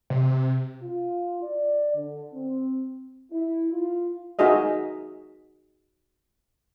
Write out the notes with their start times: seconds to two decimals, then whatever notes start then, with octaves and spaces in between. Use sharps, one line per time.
0.10 C3
0.82 F4
1.43 D5
1.94 D3
2.34 C4
3.31 E4
3.72 F4
4.39 D#4 F#4 G#4 D#5 E5